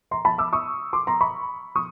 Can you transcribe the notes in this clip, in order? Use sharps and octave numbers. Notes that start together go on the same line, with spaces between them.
A#5 C6
A5 B5
D6 E6
C#6 D#6
C6 D6
A#5 C6
B5 C#6
C#6 D#6